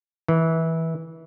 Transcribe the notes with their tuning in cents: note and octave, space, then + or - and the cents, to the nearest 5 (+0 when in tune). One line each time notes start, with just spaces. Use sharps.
E3 -20